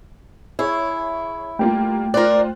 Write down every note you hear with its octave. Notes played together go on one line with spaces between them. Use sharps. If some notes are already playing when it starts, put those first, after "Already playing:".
E4 G#4 C#5
G3 A3 A#3 F4 G5
F4 A#4 C5 D5 F#6